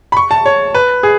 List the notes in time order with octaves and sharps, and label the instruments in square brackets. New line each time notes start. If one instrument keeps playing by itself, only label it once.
[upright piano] B5
C#6
A5
C#5
B4
G#4